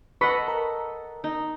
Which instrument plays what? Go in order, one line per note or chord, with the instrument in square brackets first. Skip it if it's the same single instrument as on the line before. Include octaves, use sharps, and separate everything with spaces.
[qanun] A4 D#5 F#5 [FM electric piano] B4 C#6 B6
[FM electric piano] A#4
[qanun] D#4